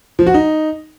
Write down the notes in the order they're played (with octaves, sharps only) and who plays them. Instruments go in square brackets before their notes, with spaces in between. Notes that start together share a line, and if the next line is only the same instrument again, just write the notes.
[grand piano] F3
F#4
D#4